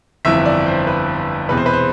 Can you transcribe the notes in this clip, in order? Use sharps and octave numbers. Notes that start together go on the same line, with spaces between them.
G1 F2 E3 E5
D5
C5
B4
E1 E2 C3 B4
C5
B4
C5